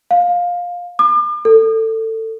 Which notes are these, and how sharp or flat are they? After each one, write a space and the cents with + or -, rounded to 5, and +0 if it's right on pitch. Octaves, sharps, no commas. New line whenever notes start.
F5 +15
D6 +40
A4 +20